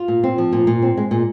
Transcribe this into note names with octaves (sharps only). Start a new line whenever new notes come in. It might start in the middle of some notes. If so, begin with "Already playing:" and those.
Already playing: F4
A#2
C4
F3
A#2
A#2
C4
G#3
A#2